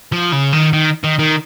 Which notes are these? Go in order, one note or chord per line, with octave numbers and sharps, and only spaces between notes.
F3
C#3
D#3
D#3
D#3
D#3